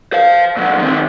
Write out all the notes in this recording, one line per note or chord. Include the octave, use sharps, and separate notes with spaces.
C5 F5
A#2 F#3
D#3 C4